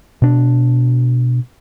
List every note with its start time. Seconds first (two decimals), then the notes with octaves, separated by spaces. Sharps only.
0.22 B2 D4